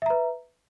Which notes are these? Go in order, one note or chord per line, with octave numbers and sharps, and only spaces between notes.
B4 E5 A#5